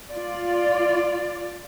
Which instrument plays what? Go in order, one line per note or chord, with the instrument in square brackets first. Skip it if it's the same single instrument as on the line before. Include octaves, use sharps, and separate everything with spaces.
[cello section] F4 D5